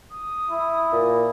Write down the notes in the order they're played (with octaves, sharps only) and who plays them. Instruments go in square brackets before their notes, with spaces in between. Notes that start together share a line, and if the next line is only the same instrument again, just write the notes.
[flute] D#6
[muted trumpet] E4
[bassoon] A#2